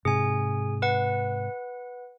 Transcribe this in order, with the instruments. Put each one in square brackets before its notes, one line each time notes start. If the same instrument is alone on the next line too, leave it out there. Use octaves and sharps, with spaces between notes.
[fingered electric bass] G#2 C3 [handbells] G#4 G#5
[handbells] B4 F#5